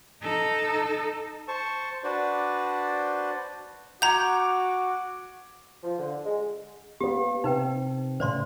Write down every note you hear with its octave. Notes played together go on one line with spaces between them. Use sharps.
D#4 A4
C5 A5 C#6
D4 F#4 B4 C5 D5
F#4 F#5 A#5 D6 G6 G#6
F3
D3
G#3
A#3 B3 G4
C3 D#4 B4 G5
A2 C#3 C5 D5 C6